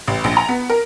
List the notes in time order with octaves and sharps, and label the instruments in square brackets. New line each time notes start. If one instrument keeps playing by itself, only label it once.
[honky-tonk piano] A1
A#1
A#5
B3
A#4